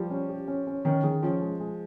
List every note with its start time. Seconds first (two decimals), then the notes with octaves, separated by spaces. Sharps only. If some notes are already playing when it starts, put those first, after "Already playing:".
Already playing: F3 G3
0.10 C#4
0.29 G4
0.48 C#4
0.67 C#4
0.85 D#3 C#4
1.03 D#3 G#4
1.23 F3 C#4
1.41 G#3
1.60 G#3